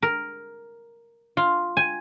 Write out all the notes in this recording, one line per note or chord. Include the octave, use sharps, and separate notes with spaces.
A#4
F4
G#5